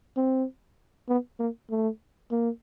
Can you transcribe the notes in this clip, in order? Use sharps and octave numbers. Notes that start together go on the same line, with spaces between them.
C4
B3
A#3
A3
A#3